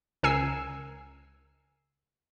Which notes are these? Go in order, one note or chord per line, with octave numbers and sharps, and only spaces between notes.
C#2 A#4 G#5 E6 C7